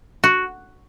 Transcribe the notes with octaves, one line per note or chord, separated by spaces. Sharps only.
F#4